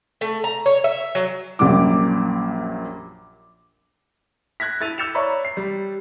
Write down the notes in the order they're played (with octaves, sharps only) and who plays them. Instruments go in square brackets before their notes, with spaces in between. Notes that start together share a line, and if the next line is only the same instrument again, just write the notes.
[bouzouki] A3
A#5
C#5
E5
F#3
[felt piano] A#1 F#2 A#2 G3 D6
[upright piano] F#6 G#6 A#6 B6
E4 A4 A6 D#7 F7
E6 G6 A6 C#7 E7 F7
C#5 D5 E5 A#5 B5 C#6
C7
G3